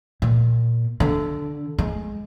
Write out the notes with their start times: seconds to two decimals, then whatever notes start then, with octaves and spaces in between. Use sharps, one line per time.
0.22 A#2
1.00 D3
1.79 G#3